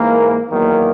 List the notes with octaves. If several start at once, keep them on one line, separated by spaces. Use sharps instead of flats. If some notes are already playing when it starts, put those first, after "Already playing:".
Already playing: G#2 E3 A#3
E2 D#3 F#3 A#3